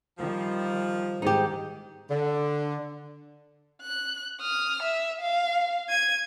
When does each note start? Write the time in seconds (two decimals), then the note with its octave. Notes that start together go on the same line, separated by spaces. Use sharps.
0.19 D#3 F3 G3
1.22 G#2 D#3 D#4 G4
2.10 D3
3.82 F#6
4.41 D#6 F6
4.83 E5
5.22 F5
5.89 G#6 D#7